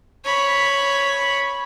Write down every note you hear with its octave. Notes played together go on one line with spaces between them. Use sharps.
C#5 B5